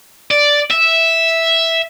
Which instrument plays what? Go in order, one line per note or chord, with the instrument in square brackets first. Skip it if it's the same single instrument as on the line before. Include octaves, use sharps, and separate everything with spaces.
[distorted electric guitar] D5
E5